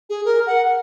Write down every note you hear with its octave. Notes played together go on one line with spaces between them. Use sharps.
G#4
A#4
F#5